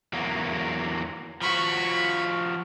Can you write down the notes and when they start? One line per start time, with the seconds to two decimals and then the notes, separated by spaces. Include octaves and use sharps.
0.13 E2 F#3 A#3
1.41 F3 F#4 B5 C#6